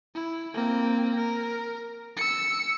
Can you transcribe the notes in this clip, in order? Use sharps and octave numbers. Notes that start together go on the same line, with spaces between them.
E4
A#3 C4
A#4
E6 C#7